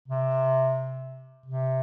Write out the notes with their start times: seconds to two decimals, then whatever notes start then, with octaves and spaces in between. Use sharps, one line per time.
0.08 C3
1.46 C3